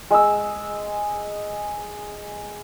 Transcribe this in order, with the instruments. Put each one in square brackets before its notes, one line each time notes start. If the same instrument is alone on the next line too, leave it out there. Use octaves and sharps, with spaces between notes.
[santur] G#3 E6